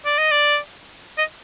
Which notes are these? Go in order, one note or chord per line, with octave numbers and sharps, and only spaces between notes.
D5
D#5
D5
D#5